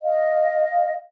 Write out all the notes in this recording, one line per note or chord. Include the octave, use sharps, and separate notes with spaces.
D#5 F5